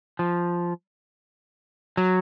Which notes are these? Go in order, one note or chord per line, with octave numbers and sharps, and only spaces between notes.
F3
F#3